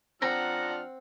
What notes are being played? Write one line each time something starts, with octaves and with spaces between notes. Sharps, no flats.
F3 C4 D4 F#5 A#5 F6